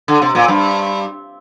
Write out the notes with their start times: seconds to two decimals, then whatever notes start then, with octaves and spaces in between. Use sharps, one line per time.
0.08 D3
0.22 C3
0.35 A#2
0.48 G2